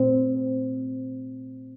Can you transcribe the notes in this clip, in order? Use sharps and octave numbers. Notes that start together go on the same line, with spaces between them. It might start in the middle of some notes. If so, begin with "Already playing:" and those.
Already playing: A#2 A3 C4